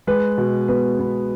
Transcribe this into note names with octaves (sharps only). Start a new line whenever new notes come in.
G#3 B4
B2
B3 B4
B3